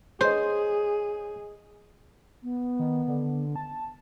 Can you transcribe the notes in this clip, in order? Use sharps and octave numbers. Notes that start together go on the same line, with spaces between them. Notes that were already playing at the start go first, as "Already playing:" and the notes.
G#4 C5 C#5 D#5
B3
D#3
D3
A5